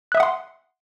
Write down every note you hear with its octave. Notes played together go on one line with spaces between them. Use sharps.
E5 F#5 C6 D#6 F#6